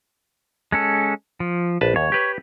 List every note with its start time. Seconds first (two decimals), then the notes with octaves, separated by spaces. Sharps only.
0.72 G#3 C#4 A4
1.40 F3
1.81 A#1 B4 A5
1.96 D#2 C#5
2.12 G4 B4